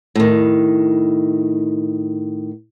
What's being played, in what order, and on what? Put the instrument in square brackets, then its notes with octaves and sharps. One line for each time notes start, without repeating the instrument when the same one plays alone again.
[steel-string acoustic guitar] A2 D#3